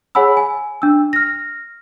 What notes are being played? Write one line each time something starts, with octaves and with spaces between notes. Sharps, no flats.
G#4 C#5 F#5 G#5 B5 E6
G#5
D4 E6
F6 A#6